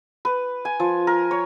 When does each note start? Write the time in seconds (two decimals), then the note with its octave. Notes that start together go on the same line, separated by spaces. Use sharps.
0.25 B4
0.65 G#5
0.80 F3
1.07 A#4
1.31 C#5